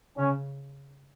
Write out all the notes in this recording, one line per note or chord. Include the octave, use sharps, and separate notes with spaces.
C#3 C#4